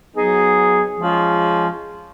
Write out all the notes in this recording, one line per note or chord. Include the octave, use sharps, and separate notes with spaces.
F#3 B3 D#4 G#4
F3 G#3 C#4 F4